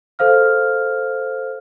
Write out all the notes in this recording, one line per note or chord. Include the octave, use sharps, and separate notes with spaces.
A4 C5 F5 F6